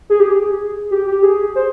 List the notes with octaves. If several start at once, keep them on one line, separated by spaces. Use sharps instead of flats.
G#4
G4
G#4
G4
G4
G#4
C5